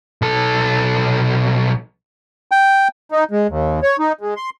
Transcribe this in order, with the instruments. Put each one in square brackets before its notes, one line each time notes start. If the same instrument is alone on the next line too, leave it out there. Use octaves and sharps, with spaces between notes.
[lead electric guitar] B1 A4
[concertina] G5
[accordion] D#4
G#3
D#2
C#5
D#4
G#3
C6